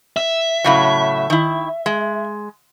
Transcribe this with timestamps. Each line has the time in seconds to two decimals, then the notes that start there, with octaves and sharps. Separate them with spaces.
0.16 E5
0.64 A2 C#3 F#3
1.30 D#3 E4
1.86 G#3